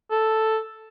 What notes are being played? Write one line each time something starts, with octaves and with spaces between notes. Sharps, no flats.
A4